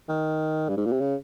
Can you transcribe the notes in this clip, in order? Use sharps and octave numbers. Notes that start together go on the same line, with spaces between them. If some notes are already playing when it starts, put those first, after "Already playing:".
D#3
G2
G#2
A#2
C3
C#3